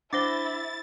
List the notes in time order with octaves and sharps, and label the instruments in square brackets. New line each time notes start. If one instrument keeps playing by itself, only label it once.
[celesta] D4 A#6 G7 [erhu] E4 [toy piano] C5 F#5 D6 [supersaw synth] A6